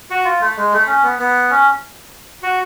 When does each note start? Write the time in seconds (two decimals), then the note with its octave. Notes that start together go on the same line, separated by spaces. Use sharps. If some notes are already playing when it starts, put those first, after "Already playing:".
0.10 F#4
0.25 F4
0.40 A3
0.57 G#3
0.73 A3
0.87 C#4
1.03 B3
1.19 B3
1.50 C#4
2.43 F#4